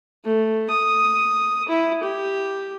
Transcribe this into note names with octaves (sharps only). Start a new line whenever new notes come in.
A3
D#6
E4
G4